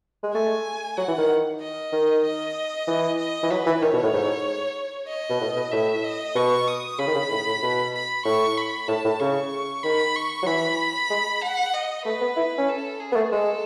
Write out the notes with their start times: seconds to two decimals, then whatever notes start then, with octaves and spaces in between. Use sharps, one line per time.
0.23 G#3
0.33 A3 G#5
0.97 F#3 F#5
1.08 E3
1.18 D#3
1.61 D#5
1.93 D#3
2.24 D#5
2.87 E3
3.19 D#5
3.43 E3
3.50 F#3 B4
3.66 E3
3.81 D#3 C#5
3.93 B2
4.03 A2
4.13 G#2
5.08 D#5
5.29 B2
5.41 A2
5.56 B2
5.72 A2 E5
6.04 D#5
6.35 B2 C#6
6.67 D#6
6.98 C#3 B5
7.07 D#3
7.14 C#3
7.31 A2
7.46 A2
7.62 B2
7.94 B5
8.25 A2 C#6
8.57 B5
8.88 A2 A5
9.04 A2
9.20 C#3 C#6
9.83 D#3 B5
10.15 C#6
10.42 F#3
10.46 E3 B5
11.10 G#3
11.42 F#5
11.74 D#5
12.05 A3 B4
12.21 B3
12.36 E4
12.58 C#4
12.69 A4
13.00 G#4
13.12 B3
13.16 A3
13.32 G#3 A4